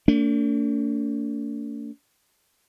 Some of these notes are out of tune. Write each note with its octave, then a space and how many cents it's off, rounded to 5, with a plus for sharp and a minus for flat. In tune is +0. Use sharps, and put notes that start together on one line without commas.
A3 +45 D4 -40